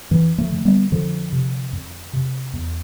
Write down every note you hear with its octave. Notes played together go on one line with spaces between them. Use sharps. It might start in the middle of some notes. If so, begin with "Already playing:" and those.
F2 E3
F3 A3
D3
G3 B3
F2 D3 F3
C3
F2
C3
E2